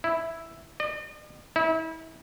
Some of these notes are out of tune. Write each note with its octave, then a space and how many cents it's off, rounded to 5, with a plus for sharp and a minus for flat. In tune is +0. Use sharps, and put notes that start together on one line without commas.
E4 +0
D#5 -45
E4 -35